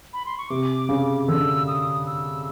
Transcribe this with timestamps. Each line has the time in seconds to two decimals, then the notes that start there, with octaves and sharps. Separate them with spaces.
0.13 B5
0.26 C6
0.38 C#6
0.49 C3 D6
0.89 C#3
1.28 D3 E6
1.67 D#6
2.06 E6